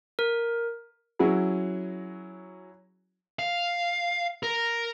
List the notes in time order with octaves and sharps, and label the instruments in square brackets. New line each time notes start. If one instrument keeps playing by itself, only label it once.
[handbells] A#4
[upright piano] F#3 C#4 E4 F#4 G#4
[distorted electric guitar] F5
A#4